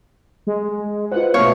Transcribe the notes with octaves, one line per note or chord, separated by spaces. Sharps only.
G#3
F4 B4 C5 F#5
B2 A3 B3 C#5 F5